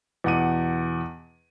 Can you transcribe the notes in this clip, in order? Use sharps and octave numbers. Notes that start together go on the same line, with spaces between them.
E2 B2 F#5 D6 D#7